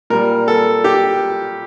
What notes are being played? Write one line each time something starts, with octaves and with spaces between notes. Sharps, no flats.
A#2 G3 A#4
A4
G4